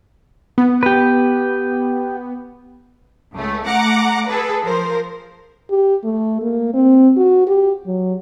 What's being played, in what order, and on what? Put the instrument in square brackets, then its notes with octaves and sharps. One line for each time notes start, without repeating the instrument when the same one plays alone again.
[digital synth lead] B3
[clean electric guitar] G4 B4
[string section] C#2 A3
A3 F#5 A#5 D6
G#4 A4 B4
F3 A#4 C5
[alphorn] G4
A3
A#3
C4
F#4
G4
F#3